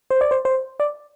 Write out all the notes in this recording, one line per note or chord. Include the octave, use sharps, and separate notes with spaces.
C5
D5
C5
C5
D5